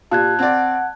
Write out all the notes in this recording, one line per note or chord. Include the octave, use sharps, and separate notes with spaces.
A#2 G4 A5 F#6 G#6
C4 D5 F#5